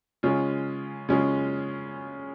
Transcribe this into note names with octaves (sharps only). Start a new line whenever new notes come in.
C#3 G#3 C#4 F4
C#3 G#3 C#4 F4